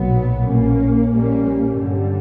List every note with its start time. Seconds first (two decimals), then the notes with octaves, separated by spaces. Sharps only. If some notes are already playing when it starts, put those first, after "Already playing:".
Already playing: B1 A#2 F#3 B3
0.48 A#1 A#2 A#3 C#4
1.12 A#1 A#2 G3 A#3 C#4
1.76 G1 G2 D3 G3